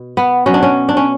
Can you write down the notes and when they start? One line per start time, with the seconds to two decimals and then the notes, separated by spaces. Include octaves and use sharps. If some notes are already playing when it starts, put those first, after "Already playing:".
Already playing: B2
0.17 B3
0.46 B2 F#3 C#4
0.54 D4
0.63 C#4
0.89 D4
0.97 C#4